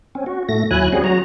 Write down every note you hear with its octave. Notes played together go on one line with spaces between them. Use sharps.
C4 C#4
F#4
A2 A3 A#6
D#2 F#3 E4 G#5 F#6
G3 C4 C#4 F#4 G#4
F#3 F#4 A#5